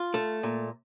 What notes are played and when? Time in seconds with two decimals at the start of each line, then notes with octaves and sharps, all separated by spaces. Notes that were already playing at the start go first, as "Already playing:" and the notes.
Already playing: F4
0.14 A3
0.43 A#2